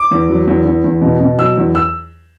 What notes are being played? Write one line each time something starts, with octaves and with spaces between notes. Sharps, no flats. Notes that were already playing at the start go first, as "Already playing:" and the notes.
Already playing: D6
E2
F#3
E2
E2
E2
B2
B2
F#3 E6
E2
E6